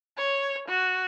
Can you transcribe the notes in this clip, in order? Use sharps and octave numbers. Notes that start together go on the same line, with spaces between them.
C#5
F#4